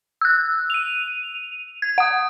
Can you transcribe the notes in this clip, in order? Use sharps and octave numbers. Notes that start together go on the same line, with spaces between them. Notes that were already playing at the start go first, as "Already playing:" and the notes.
E6 F#6
D#7 F7
G#6
F#5 D#6